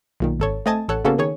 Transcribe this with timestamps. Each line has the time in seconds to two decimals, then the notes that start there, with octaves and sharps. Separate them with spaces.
0.20 B1 A#2 D#3
0.40 G#1 A4 C#5
0.66 A3 C4 D#5 G#5 A5
0.88 A1 A4 C#5 F#5
1.05 C#3 A#3 B3 C#4 F#4 A4
1.18 D#3 G#4 C#5